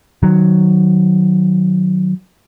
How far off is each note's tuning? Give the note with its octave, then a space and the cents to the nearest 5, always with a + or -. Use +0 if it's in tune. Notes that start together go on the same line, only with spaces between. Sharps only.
D#3 -15 F#3 +0